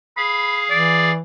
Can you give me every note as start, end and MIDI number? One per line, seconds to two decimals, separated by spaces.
0.17 1.11 68
0.17 1.11 77
0.17 0.57 83
0.70 1.21 52
0.70 1.12 74